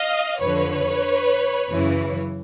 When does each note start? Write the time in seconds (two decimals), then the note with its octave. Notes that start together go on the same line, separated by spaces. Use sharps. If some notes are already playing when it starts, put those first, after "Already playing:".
Already playing: D#5 F5
0.40 F2 D3 F3 B4 C#5
1.70 F#2 C#3 E3